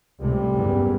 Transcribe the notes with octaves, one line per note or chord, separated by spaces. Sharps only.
C#2 A2 C3 G3
F#1 E2 G2